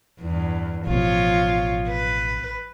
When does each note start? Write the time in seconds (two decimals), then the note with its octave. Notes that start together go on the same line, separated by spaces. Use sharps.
0.20 E2 G2
0.87 A1 B2 F3 F4 C#5
1.89 B4